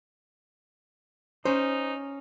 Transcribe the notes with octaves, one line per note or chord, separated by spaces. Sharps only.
C#4 D#4 C5